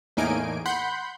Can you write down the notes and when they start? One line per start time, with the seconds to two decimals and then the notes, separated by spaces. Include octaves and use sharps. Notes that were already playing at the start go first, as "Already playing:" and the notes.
0.17 E2 A2 A#3 D#4 G#5 D7
0.66 F#5 B5 C6 G6